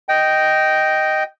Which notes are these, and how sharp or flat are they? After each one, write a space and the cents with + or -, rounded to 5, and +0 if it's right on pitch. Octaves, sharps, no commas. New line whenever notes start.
D#5 +0 G5 -10